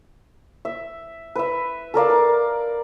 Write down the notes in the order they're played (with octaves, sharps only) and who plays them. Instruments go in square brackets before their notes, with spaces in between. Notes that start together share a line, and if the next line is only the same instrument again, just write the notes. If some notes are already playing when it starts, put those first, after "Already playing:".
[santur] E5
B4 E5
A4 A#4 D5 F5
A#4 D6